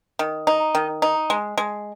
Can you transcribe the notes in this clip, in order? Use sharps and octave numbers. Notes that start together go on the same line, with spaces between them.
D#3
D#4
D#3
D#4
G#3
G#3